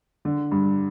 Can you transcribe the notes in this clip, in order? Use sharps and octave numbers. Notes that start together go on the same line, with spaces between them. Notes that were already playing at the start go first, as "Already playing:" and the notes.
D3
G2